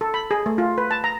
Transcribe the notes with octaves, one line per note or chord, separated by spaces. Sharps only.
A4
B5
G#4
A3
F4
B4
A5
A#5